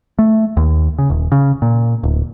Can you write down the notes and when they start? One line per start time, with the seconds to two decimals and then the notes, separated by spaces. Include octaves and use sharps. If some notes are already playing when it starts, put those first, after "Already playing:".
0.19 A3
0.57 D#2
0.98 C#3
1.10 D#1
1.32 C#3
1.62 A#2
2.03 D1